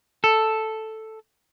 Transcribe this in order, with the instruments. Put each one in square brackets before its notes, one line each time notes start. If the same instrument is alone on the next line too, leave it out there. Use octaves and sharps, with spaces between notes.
[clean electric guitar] A4